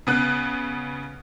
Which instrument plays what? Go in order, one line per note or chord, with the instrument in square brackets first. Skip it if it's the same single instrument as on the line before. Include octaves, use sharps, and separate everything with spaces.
[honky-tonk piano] C#3 B3 F#6